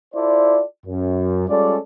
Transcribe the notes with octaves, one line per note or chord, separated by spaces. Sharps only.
E4 F4 A4 C5 D5
F#2
G3 G#3 C#4 F4 A4 D5